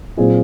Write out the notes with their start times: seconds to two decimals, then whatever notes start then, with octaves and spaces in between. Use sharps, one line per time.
0.17 A#2 F#3 C4 F4 G#4